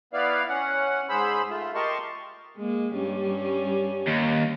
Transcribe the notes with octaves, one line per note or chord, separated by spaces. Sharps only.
B3 E4 B4 D5 F5
C#4 F#5
G#2 G#4 C5 B5 E6
A3 F4
G4 A#4 D#5 A5 C6 C#6
G#3 A#3
G2 G3 C#4
D#2